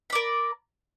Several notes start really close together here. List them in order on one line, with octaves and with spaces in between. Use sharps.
B5 D5 A#4